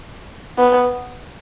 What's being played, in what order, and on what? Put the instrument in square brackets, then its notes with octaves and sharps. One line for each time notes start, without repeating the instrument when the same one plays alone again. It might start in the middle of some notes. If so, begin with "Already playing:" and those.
[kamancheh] B3